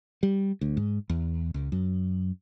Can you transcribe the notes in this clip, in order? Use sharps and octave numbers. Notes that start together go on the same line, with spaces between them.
G3
D2
G#2
E2
C#2
F#2